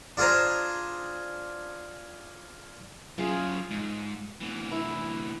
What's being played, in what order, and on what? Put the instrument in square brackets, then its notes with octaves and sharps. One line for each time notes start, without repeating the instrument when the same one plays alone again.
[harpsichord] D4 F4 G#4 C5 A#5
[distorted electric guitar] F#2 C#3 [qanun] F4 G#4
[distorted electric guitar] G#2
D2 E3
[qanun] E4